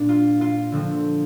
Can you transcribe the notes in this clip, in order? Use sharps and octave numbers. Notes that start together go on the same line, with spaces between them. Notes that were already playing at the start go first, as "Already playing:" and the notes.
Already playing: A#2 D4
F4
F4
D3 F3 C4